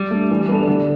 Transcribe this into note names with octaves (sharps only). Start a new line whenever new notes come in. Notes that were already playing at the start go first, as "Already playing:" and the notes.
Already playing: G3
A3 D4 A4
E3
B3 D4 A4
D3